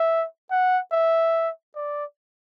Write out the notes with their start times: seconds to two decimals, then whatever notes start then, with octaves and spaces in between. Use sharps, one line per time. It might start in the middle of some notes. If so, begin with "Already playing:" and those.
Already playing: E5
0.51 F#5
0.92 E5
1.75 D5